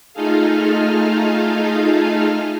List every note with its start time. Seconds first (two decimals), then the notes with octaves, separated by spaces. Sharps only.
0.13 A3 D#4 F4 G#4 A4 F5